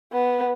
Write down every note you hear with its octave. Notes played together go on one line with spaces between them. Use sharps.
B3